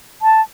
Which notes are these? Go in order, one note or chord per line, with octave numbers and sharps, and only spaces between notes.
A5